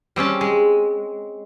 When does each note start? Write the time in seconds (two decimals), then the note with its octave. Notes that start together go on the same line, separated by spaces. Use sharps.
0.16 G3 C4 C#4 A5
0.41 G#3